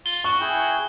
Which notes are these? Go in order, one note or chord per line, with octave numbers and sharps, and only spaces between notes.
F4 G7
F#4 C#6
E4 G#4 G5